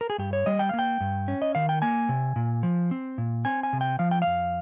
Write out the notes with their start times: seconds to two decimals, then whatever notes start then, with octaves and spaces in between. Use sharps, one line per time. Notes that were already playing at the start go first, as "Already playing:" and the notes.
0.01 A#4
0.10 G#4
0.18 G2 G4
0.33 C#5
0.46 G3 D#5
0.59 G5
0.69 A#3 F5
0.79 G5
1.01 G2
1.28 C#4
1.42 D#5
1.55 D#3 F5
1.69 G5
1.82 A#3 G#5
2.09 C3
2.36 A#2
2.63 F3
2.91 C4
3.18 A#2
3.45 C4 G#5
3.63 G#5
3.73 C3
3.81 G5
3.99 F3 F5
4.11 G5
4.22 F2 F5